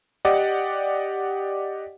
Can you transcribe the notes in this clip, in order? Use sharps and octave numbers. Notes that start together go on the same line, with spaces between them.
G4 D5 D#5 F#5